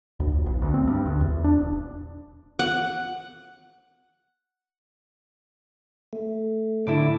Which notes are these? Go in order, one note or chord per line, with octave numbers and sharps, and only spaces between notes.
D2
D#1
B1
D2
C4
G2
D2
E2
D4
D#1
F#5
A3
A2 D3 E4 D6